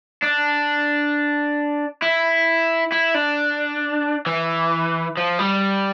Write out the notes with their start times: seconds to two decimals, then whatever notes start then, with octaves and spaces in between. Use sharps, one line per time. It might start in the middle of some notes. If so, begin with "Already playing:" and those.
0.22 D4
2.02 E4
2.92 E4
3.15 D4
4.26 E3
5.17 F3
5.39 G3